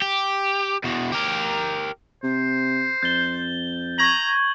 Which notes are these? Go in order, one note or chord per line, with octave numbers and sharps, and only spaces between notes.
G4
E2 B2
G4 A#4
C3 C5
F2 G6 A6 G7
A#5 C#6 G#6 F#7